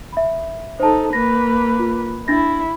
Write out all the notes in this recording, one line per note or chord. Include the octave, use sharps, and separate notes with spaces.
E5 B5
D#4 A4 C5 A5
A#3 B4 A#6
F4
D4 E4 A6 A#6